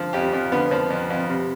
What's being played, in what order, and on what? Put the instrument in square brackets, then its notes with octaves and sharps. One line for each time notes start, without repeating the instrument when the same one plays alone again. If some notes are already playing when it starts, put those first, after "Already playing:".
Already playing: [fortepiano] D3 F3
F2 G4
F2
D3 B3
F3
F2
F2
C3